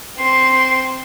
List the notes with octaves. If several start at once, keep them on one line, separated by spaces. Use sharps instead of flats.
C4 C6